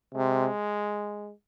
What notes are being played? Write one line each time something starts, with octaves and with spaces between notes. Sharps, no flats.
C3 G#3